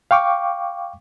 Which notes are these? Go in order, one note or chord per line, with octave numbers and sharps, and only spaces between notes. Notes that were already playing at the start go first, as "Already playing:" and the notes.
F5 G5 C#6 D6